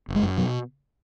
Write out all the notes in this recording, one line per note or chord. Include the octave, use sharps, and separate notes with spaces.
F#1
G#3
F#2
B2 F#3